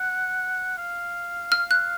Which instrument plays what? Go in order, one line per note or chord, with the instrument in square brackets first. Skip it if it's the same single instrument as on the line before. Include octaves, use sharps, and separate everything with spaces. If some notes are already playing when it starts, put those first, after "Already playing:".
Already playing: [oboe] F#5
F5
[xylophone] F6
F#6